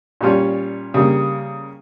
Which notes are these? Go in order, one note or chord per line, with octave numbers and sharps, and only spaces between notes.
A#2 G3 C#4 F4
C#3 G3 A#3